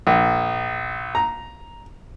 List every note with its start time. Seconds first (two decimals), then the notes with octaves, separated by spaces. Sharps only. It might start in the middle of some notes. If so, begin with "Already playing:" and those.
0.07 A#1
1.15 A#5